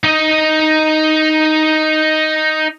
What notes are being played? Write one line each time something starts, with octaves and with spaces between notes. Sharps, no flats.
D#4 D#5